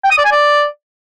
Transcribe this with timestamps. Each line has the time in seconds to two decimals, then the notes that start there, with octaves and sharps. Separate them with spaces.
0.04 G5
0.11 D#6
0.18 D5
0.25 G#5
0.32 D5